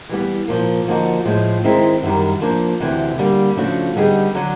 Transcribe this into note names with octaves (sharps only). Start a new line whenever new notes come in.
E3 G3 B3
A#2 F3 A#3
D3 F3 A#3 D#4 F#4
A2 F3 G#3
D#3 G#3 C4 E4
F#2 D#3 G3
F3 A#3 D4
D2 C3 E3
D3 G3 A#3
C#3 F3 A3 D4 F#4
D3 G3 B3 D#4 G#4
D3 F#3